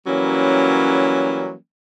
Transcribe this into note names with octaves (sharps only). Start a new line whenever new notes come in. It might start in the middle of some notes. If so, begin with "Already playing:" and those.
E3 F#3 G3 A#3 C#4